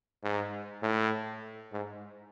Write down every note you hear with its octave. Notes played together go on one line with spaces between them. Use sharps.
G#2
A2
G#2